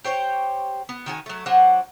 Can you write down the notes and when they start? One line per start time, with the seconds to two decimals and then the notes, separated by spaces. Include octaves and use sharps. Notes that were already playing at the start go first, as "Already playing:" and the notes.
0.04 G4 C5 C#5 G5
0.89 B3
1.06 D#3 F#4 G#4 G#5
1.26 F#3 A3
1.46 F#3 D4 C5 F#5